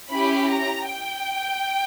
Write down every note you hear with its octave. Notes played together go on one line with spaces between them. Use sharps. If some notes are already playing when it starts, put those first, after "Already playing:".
C#4 E4 G4 B5
A#5
G5